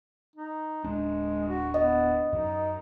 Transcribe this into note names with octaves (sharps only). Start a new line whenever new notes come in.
D#4
D1 G#3 D4
F#4
B3 D#5
F#2 D#4